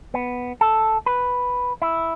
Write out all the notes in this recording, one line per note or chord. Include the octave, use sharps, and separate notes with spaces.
B3
A4
B4
E4